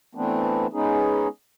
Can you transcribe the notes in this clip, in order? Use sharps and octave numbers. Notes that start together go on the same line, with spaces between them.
E3 A3 B3 C4 D4
G#3 B3 C#4 D#4 G#4